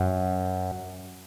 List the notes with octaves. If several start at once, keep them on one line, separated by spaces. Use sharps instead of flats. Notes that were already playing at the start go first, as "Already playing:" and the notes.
Already playing: F#2